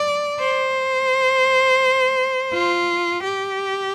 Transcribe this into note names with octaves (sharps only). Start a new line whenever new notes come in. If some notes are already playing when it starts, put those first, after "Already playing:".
Already playing: D5
C5
F4
G4